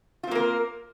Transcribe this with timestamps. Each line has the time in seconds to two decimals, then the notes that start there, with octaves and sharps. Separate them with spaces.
0.23 F4
0.27 C4
0.31 A#3
0.35 A#4